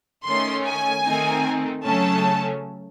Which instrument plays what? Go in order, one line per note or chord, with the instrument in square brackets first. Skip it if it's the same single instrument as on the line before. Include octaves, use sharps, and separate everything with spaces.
[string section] D#3 A3 C#4 C6
G#5
D#3 A3 C4 D#4
C#3 F#3 A3 C#4 A5